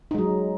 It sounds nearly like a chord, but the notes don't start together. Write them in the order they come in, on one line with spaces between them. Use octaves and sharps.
D#4 G#3 F#3